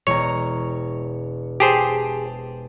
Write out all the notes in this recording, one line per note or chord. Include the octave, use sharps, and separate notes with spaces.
E1 C#5 A#5
G4 G#4 C5 A5